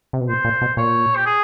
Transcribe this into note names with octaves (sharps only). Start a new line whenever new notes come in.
C3
B2
A#2 C5
A#2
B2
A#2 C#5
G4
G#4